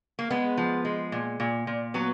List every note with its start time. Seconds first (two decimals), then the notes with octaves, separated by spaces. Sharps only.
0.19 A#3
0.30 G#3 B3
0.57 F3
0.85 G#3
1.12 A#2
1.40 A#2
1.67 A#2
1.94 F#3 B3